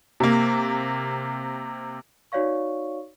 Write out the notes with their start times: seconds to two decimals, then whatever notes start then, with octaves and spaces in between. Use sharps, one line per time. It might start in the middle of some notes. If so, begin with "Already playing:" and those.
0.20 C3 A#3
2.32 D#4 F#4 C#5 D5 F5 C#6